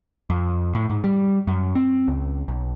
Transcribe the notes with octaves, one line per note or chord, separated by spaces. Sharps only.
F2
A2
G#2
G3
F#2
C4
C#2
B1